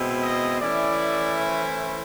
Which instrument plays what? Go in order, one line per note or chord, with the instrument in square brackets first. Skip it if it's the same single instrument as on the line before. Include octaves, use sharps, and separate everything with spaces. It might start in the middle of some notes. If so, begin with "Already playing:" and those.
Already playing: [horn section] B2 G#3 C4 E4
D#5
E3 A3 C#4 E4 D5
C5